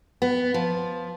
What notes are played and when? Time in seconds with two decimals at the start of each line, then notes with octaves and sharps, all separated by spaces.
0.22 B3
0.54 F3